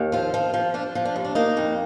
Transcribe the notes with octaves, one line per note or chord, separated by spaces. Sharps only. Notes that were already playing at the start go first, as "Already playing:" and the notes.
Already playing: D#2
F3 F4
F3
F3
F3 D4
F3
D4
D#2
D4
A#3 D#4
F2